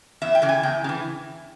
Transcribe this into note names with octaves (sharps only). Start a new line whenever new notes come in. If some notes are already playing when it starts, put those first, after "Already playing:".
E2 E5
G5
C#3 E3
G#5
E2 G5
C#3
E3